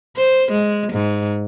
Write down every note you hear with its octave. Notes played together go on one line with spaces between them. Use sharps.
C5
G#3
G#2